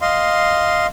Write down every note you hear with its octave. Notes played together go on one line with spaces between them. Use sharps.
D#5 F5 C6